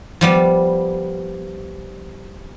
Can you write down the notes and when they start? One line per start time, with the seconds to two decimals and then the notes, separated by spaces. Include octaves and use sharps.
0.21 F3 G3 B3